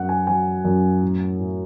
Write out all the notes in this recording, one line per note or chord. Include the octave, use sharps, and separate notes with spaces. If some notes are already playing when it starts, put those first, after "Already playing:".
Already playing: F#2 F#3 F#5
G#5
F#3 G#5
F#2
A2
A2